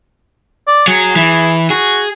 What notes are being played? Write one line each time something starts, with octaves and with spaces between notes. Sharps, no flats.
D5
F#3 G#4
E3
F#4 G#4